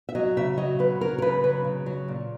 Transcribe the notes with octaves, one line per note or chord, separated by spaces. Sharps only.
E5
F#3 D#5
C#3 E5
F#3 D#5
C#3 B4
F#3 A#4
A#4
C#3 B4
F#3 B4
C#3
F#3
A#2